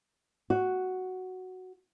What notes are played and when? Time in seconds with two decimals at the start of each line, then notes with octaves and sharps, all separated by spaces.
0.50 F#4